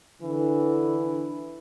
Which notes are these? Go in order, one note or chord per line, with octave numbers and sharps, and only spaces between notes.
D3 E3